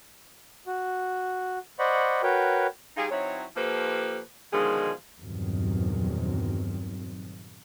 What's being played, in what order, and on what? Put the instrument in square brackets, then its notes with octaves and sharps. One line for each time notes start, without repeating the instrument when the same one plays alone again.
[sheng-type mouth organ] F#4
C5 D5 D#5 F#5 B5 C#6
F#4 A#4 B4 C#5 G5
[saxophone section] G3 D#4 F4 G#4
F#3 C4 D#4 E4 C#5
F3 A#3 G4 A4 B4 C5
B2 D3 D#3 F3 G#3 G#4
[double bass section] E2 G2 A#2 D#3 F#3 C4